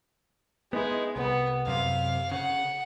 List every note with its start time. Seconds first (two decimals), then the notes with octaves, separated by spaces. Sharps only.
0.73 G#3 B3 D#4 E4
1.16 C2 B3
1.66 F#2 C3 C4 F5
2.32 C#3 F#5